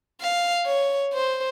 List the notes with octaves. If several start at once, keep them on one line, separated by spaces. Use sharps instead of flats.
F5
C#5
C5